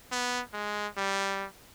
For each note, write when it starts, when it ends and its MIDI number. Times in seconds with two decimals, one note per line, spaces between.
0.12 0.42 59
0.53 0.87 56
0.97 1.46 55